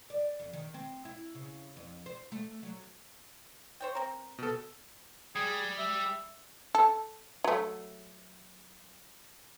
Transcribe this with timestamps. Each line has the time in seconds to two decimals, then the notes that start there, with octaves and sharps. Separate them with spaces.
0.10 D5
0.40 F2
0.53 D#3
0.74 C4
1.05 E4
1.35 C#3
1.77 F2
2.06 C5
2.32 A3
2.63 F#3
3.80 C5 C#5 G5
3.95 C4 A#4
4.38 B2 A4
5.36 G3 G#4
5.79 E5
6.75 A4
7.44 F#3 A3